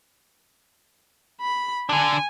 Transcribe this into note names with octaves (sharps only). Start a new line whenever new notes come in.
B5
D3 D4 G#5